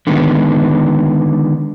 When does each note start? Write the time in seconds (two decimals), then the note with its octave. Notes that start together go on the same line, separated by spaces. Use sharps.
0.07 D3 D#3 G#3 B3